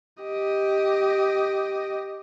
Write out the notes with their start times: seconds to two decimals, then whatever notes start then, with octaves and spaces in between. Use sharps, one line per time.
0.23 G4 D#5